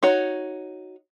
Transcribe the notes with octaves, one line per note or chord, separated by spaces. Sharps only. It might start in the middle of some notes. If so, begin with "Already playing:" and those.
D#4 F#4 C#5